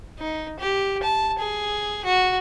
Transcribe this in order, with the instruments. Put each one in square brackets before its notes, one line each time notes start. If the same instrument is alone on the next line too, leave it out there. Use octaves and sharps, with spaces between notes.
[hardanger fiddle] D#4
G4
A5
G#4
F#4